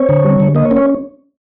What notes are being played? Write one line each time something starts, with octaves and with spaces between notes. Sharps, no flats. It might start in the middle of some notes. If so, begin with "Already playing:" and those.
Already playing: C4 C#5
D3
G3
D3
A#3 D#5
C#5
C#4
C#5